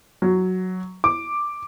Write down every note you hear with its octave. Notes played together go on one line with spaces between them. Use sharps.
F#3
D6